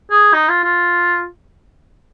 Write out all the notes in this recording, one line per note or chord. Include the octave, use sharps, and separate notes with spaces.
G#4
D#4
F4
F4